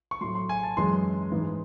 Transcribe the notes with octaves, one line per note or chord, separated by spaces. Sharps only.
C#6
A2 F#3 C6
C6
G#5
A5
F#2 E3 G#3 C6
G#2 E3 G#3